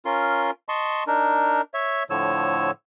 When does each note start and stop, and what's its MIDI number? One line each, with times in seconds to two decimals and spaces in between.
0.05 0.51 61
0.05 0.51 65
0.05 0.51 70
0.05 0.51 84
0.69 1.04 75
0.69 1.04 81
0.69 1.04 84
0.69 1.04 85
1.07 1.61 62
1.07 1.61 63
1.07 1.61 70
1.74 2.03 73
1.74 2.03 76
2.10 2.71 45
2.10 2.71 50
2.10 2.71 53
2.10 2.71 73
2.10 2.71 88